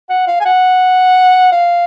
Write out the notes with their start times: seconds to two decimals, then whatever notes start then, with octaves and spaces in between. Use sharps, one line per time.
0.10 F#5
0.28 F5
0.40 G#5
0.46 F#5
1.52 F5